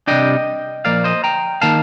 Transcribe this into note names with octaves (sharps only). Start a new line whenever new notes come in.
C3 G3 D4 D#5 G5
A#2 F3 A#3 D5 F5
C5 D#5
G5 A#5
D#3 A#3 F5 A5